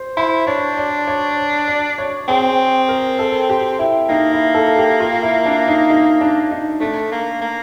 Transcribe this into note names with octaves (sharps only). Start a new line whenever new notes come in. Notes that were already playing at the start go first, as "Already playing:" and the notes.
Already playing: C5
E4 C5
D4 C#5
D5
C#5
D5
C#5
C4 G#4
A#4
A4
G4
E4
A#3 D#4
E4
A4
G4
F4
E4
D4
D#4
D#4
D4
D#4
A3 D4
A#3
A#3